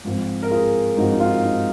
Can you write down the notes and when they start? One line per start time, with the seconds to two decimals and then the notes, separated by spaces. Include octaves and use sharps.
0.04 G#2 F3 C4
0.43 A#4
0.50 F4 G#4
0.97 G#2 F3 C4 D#4 F#4
1.11 D#4
1.20 F4
1.43 D#4